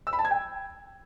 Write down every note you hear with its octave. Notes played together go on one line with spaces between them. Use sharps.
E6
B5
A5
G#6
G5